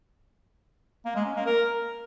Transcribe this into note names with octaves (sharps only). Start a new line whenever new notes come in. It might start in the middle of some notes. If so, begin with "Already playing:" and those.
A#3
G#3
C#4
A#3
A#4